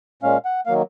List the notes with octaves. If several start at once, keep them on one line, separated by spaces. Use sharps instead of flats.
A#2 G#3 C#4 F5
F#5
D#3 F#3 A#3 F5